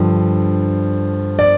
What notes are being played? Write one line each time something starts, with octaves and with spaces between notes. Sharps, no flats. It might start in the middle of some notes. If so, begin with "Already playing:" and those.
Already playing: G2 D3 F3
D5